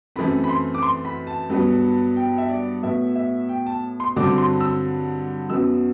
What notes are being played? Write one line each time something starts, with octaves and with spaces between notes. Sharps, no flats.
F#2 E3 A3 C4 B5
B5
C6
D6
C6
B5
A5
G2 F#3 B3
G5
E5
D5
A2 F#3 B3 E5
E5
G5
A5
C6
G2 D3 F#3 C4 D6
C6
E6
F#2 F#3 B3 E6